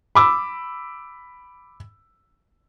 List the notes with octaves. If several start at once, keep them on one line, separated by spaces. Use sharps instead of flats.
B5 D6 E6